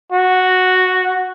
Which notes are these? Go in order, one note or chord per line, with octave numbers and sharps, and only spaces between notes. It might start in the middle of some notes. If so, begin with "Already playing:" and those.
F#4